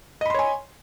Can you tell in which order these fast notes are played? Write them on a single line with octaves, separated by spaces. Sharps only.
D#5 B5 C6 C#5 G#5